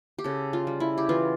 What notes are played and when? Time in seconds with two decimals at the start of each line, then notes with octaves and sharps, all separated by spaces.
0.18 G4
0.24 C#3 A4
0.53 F4
0.67 G3
0.80 E4
0.98 G4
1.09 E3 F4